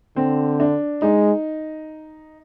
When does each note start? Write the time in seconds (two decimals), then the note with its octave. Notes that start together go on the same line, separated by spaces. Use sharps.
0.16 D3 C4
0.60 D4
1.02 G#3 D#4